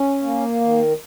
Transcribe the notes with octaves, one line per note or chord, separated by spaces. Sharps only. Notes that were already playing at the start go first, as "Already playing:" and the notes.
Already playing: C#4
A#3
D#3